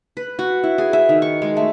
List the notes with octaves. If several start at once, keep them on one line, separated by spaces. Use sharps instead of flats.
B4
F#4
E4
G#4
E5
D#3
C#6
G#3
A3